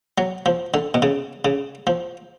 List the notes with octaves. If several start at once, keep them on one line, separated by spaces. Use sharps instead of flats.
F#3
F3
D3
B2
C#3
C#3
F3